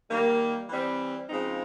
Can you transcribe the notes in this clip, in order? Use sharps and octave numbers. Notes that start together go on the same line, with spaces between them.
D#3 G3 A#3
E3 G3 C4
C#3 F3 G#3 C4 D#4